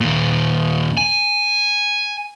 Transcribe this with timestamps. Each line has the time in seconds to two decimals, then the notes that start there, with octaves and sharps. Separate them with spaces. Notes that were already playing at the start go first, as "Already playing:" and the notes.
0.01 D#2 A#2
0.97 G#5